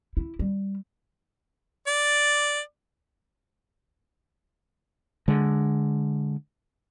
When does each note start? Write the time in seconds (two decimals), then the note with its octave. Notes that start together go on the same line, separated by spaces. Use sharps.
0.17 E4
0.39 G3
1.87 D5
5.28 D3 G#3